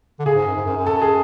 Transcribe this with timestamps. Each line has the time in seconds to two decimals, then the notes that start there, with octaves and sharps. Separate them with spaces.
0.19 D3
0.25 C#3 G#4
0.36 G#2
0.47 F#2
0.56 G#2
0.66 F#2
0.77 F#2
0.86 A4
1.02 G#4